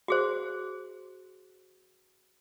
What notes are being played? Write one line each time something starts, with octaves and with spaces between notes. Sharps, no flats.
F#4 G#4 C5